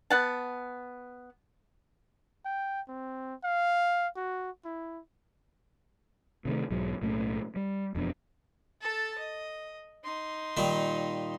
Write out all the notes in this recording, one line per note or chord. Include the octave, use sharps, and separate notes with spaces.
B3 F#5 A5
G5
C4
F5
F#4
E4
C3 D#3 A3
B1 G#2 F#3 G#3
B1 A2 A3 C#4
G3
E1 F2 B3 D4
A4 A5
D#5
D#4 C6
A#2 D#3 G3